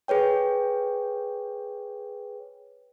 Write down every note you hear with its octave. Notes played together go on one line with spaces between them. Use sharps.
G#4 B4 C#5 G5